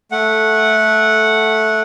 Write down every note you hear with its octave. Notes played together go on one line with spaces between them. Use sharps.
A3 F#5